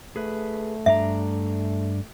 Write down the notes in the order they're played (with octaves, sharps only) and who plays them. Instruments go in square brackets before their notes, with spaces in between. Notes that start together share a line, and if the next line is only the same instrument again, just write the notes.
[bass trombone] A3 [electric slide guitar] G#4 B4
[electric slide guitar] G2 D4 A#5 [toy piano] E5